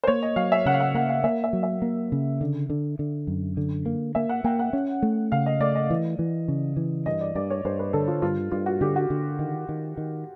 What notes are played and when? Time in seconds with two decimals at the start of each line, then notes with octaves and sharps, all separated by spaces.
0.04 C5
0.07 A#3 C#5
0.22 D#5
0.36 F#3 F5
0.52 E5
0.66 C#3 F#5
0.74 F5
0.80 F#5
0.95 A#3 F#5
1.09 F5
1.24 A#3 E5
1.44 E5
1.53 F#3
1.63 E5
1.82 A#3
2.12 C#3
2.41 D3
2.70 D3
2.99 D3
3.27 F#2
3.57 D3
3.86 A#3
4.15 A#3 E5
4.29 F#5
4.44 A#3 G5
4.59 F#5
4.73 C#4
5.02 A3
5.32 C#3 F5
5.46 D#5
5.60 A3 D5
5.75 D#5
5.90 E3
6.19 E3
6.48 C#3
6.77 E3
7.06 G2 D#5
7.21 D5
7.35 G2 D5
7.50 C#5
7.65 G2 C5
7.79 B4
7.93 D3 A4
8.08 F4
8.22 G2 F4
8.52 G2 F4
8.66 F#4
8.81 D3 G4
8.96 F#4
9.10 D3
9.39 D#3
9.69 D#3
9.98 D#3